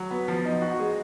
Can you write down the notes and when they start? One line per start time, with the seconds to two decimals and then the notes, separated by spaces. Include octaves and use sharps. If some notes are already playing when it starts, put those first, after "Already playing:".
Already playing: F#3
0.11 B3
0.28 F3
0.45 D#4
0.62 F#4
0.79 G#3